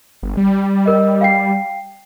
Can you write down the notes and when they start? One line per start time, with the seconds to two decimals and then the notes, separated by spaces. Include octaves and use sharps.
0.23 G1
0.37 G3
0.86 A#4 D#5
1.21 F5 G5 C7